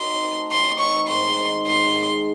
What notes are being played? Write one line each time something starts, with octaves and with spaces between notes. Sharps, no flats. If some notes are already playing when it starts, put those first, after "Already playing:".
Already playing: D#4 F#4 C6
C4
A3
E3 C6
D#4
C#6
C4
G#2 C6
G#3
D#3
G#2 C6
G#2
G#3